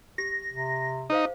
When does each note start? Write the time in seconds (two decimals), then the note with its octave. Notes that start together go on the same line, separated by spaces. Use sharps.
0.18 G4 A#6
0.50 C3
1.10 D#4 G#4 C5 F5